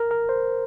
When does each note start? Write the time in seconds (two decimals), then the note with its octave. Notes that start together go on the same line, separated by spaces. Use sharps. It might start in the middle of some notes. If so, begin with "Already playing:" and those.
Already playing: A#4
0.11 A#4
0.29 C5